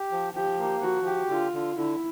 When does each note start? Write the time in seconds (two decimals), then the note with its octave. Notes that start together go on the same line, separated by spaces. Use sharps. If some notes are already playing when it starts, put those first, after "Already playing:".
Already playing: G4
0.11 F3
0.35 F3 G4
0.59 A#3
0.81 F3 F#4
1.06 G4
1.29 D3 F4
1.53 D3
1.76 D3 E4